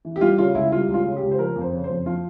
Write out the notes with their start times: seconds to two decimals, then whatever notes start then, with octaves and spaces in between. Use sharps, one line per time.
0.05 E3
0.16 G4
0.21 G3 F4
0.38 C#3 F4
0.54 C#2 E4
0.72 G3 F4
0.88 C#2
0.94 F4
1.05 C#3
1.16 G4
1.22 C#2
1.31 C5
1.39 F3 A#4
1.56 F2
1.61 C5
1.72 C#3
1.84 C5
1.90 F2
2.06 F3 F4